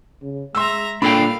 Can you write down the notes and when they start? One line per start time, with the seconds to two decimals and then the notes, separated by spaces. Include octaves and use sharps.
0.22 C#3
0.55 G#3 E5 A#5 C6 E6
1.02 A#2 D4 A4 F5 G5 B5